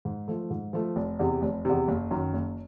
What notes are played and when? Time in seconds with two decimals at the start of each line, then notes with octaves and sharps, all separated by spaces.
0.05 G#2
0.28 F3 A3
0.50 G#2
0.73 F3 A3
0.96 F1
1.19 E2 C3
1.42 F1
1.65 E2 C3
1.88 F#1
2.11 F#2 D#3
2.33 F#1